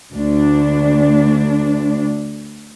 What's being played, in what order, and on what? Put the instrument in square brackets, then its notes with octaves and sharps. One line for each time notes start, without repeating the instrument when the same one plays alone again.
[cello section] D2 D4